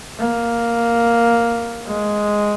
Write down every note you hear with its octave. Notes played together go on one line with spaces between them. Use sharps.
A#3
G#3